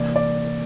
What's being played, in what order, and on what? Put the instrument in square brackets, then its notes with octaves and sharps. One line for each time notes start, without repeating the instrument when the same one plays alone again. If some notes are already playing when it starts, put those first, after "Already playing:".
Already playing: [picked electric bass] C3 E3 A#3 [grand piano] D5
[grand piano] D5